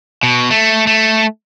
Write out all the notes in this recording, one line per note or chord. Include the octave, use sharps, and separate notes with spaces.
B2
A3
A3